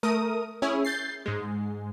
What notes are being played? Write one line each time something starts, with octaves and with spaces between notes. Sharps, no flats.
A3 A#4 D#6 D#7
C#4 E4 G#4
G6 A6 C7
G#2 G#3